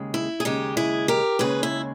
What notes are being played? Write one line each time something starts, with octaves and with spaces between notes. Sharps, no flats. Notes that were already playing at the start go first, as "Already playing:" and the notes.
Already playing: D#2 C#3 G#3
E4
G#4
D#2 C#3 G#3 D#4 G4
E4 G#4
G4 A#4
D#2 C#3 G#3 G#4 B4
E4